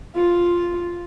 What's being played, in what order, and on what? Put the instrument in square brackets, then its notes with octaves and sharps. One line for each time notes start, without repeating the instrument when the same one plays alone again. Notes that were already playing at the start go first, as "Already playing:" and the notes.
[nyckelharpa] F4